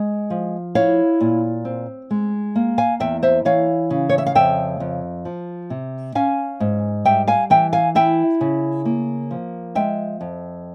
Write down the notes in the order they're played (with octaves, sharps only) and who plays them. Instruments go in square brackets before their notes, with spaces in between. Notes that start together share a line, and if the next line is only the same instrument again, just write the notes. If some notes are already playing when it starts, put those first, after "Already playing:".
Already playing: [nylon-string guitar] G#3
F3
E4 C#5 F5
A#2
C4
G#3
A#3
F5 G#5
E2 E5 G5
C5 E5
E3 C#5 F5
C#3
C#5
E5
F5
F2 E5 G5
F2
F3
C3
C#4 F5 G#5
G#2
G3 E5 G5
F5 G#5
E3 E5 G5
F5 G#5
E4 E5 G5
C#3
A#3
F3
G#3 E5 G5
F2